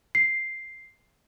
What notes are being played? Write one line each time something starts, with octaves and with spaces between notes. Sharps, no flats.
C7